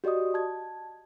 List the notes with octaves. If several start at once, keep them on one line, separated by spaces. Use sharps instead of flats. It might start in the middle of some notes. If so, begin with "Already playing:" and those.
F#4 G4 D5 D#5 D#6
A5 G#6